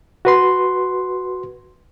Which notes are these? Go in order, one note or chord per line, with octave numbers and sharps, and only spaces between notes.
F#4 B4 C6